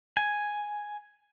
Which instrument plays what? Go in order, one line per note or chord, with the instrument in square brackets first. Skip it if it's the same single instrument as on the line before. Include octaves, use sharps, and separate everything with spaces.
[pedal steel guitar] G#5